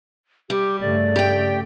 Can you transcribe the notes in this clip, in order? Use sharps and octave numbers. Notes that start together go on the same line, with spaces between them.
G3 G4
G2 C#3 A3 D5
G4 G5